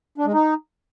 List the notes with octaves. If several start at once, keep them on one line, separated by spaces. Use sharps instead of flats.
D4
G#3
D#4